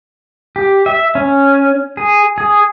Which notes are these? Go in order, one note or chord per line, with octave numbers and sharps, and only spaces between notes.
G4
E5
C#4
G#4
G#4